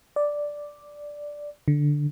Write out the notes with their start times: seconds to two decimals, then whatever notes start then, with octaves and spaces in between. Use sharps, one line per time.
0.16 D5
1.68 D3